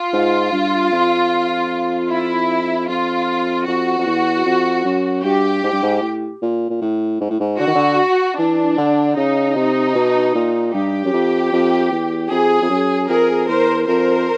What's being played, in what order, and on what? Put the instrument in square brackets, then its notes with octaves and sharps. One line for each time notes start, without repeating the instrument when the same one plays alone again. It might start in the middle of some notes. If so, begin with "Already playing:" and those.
Already playing: [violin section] F4
[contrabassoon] G#2
G2
F2
[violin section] E4
[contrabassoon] F2 [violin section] F4
[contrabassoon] F2 [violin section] F#4
[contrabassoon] F2
E2
F2
F#2
[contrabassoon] G2 [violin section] G4
[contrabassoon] G#2
G2
G#2
A2
A#2
A#2
A2
G#2
A2
G#2
[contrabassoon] D3 [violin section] F#4
[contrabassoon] D#3
D3
[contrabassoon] E3 [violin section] D4
[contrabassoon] D3
[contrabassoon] C#3 [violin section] D#4
[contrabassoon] C3
B2
A#2
[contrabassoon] G2 [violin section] G4
[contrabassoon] F#2
F2
F2
E2
[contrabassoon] F2 [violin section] G#4
[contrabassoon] F2
F#2
[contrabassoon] F2 [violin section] G#4 A#4
[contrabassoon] E2 [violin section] A#4 C5
[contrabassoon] F2 [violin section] A#4 C5